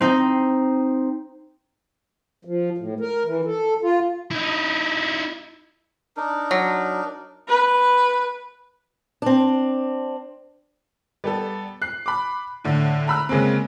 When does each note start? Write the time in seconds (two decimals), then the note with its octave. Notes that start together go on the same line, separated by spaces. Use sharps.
0.01 C4 D#4
2.45 F3
2.78 A2
3.00 A#4
3.25 E3
3.45 A4
3.82 F4
4.31 D#4 E4
6.17 D4 D#4 A#4
6.51 F#3
7.48 B4
9.22 C4 D4
11.24 G3 B3 A4
11.82 F#6 C7
12.06 B5 D6
12.64 A2 D3
13.07 A#5 B5 E6 F#6
13.29 C#3 G#3 A#3 C4